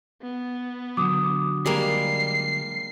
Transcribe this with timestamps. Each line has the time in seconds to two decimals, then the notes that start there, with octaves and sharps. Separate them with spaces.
0.22 B3
0.97 D3 F#3 D6 D#6
1.66 G3 G#3 A#3 C7